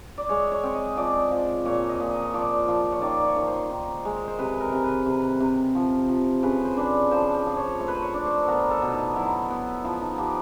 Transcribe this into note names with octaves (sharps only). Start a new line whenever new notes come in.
D5
G#3 C#5
C#5
C4
D#5
F3 D5
F3
A#2 C#5
D#5
A#2
D#5
F3 D5
F3
C#5
D#3 D5
C#5
D#3
C5
D#3
G#3
C5
C3 B4
A#4
C3
B4
C3
C3
F3
F3
C#3 B4
C5
D4 B4
F3 C5
C5
F3
C#5
A3 C5
B4
C5
C#5
D4
C5
A4
B3 A#4
A4
B2
D#4
F#3 E4
B3
F3 E4
D#4
F3 G4